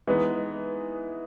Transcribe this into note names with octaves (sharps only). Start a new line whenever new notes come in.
E3 G#3 B3 D#4